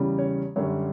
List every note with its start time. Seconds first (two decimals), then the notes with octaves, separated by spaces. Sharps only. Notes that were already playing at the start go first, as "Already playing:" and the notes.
Already playing: E2 C#3 G3 C#4
0.19 C#5
0.56 F#2 D3 G3 C#4 C#5